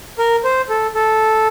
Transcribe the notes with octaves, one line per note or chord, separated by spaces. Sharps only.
A#4
C5
A4
A4